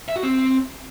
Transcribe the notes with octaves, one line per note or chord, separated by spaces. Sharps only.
E5
F#4
C4